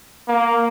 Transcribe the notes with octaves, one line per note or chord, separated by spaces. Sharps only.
A#3